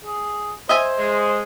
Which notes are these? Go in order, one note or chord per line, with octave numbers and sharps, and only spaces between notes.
G#4
C5 D#5 E5 G#5
G#3